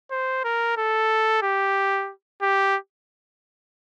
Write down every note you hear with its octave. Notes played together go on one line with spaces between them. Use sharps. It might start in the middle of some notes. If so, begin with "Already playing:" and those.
C5
A#4
A4
G4
G4